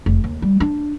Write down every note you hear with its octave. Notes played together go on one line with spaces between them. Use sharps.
F1
D#2
G3
D4